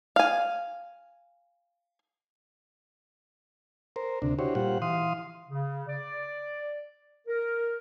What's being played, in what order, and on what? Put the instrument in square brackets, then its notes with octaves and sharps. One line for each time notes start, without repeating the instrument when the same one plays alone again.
[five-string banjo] F5 G#5
[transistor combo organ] A#4 C5
D2 C3 D4
D4 E4 F#4 G4 C5 C#5
A#2 G3 F4 G4 C5 F#5
E3 F5 C6 D#6
[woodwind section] C#3
D5
A#4